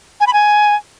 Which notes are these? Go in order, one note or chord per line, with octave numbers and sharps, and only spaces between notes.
G#5
B5
G#5